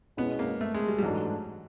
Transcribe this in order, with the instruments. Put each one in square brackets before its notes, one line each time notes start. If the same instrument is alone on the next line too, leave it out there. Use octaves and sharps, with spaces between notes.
[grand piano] B2 G#3 C#4 E4 [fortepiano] B3
[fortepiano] A#3
A3
G#3
G3
G3
[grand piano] G#2 E3 A3 D4 [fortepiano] F#3